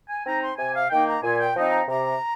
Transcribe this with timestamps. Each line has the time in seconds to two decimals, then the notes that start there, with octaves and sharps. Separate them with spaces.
0.09 G#5
0.25 C4 D#4 A#5
0.41 C6
0.57 C3 G#5
0.74 F5
0.90 D#3 A#3 D#4 G5
1.07 A#5
1.23 A#2 G#5
1.40 G5
1.55 F3 C4 D#4
1.72 A#5
1.88 C3 A#5